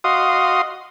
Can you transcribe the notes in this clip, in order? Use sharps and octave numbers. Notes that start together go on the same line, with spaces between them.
F#4 D#5 F5 C6 D#6